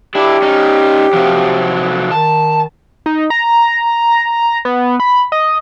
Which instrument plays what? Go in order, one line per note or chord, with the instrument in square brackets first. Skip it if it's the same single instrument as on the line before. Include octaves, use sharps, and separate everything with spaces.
[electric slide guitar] D4 E4 [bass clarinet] G4
[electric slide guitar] C#4 D#4
C3 F3 F#3
[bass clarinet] D#3 [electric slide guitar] A5
[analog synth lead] D#4
A#5
B3
B5
D#5